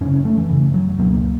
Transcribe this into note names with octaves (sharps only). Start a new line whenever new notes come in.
F#2 C#3 C#4
C#4
A3
E3
F#2 C#3
F#3
C#2 B2 A#3